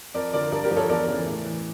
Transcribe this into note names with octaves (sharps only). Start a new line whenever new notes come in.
F2 A#4 D5
D3 F3 A#4 D5
G2 A#4 D5
G4 A#4
F3
A4 C#5
E2 A#4 D5
C#3 E3
A2
E3